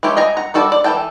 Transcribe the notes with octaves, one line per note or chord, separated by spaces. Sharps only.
G#3 A3 G4 C#5
D#5 G#5 A#5
F#5 A#5
G3 F#4 A4 D5 A5
D5
E3 G#4 A4 G5 A5